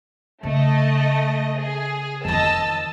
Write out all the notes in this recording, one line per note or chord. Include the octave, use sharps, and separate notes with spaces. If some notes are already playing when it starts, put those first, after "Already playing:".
C#3 A3 D#5
G#4
F2 D#3 D#5 A5 E6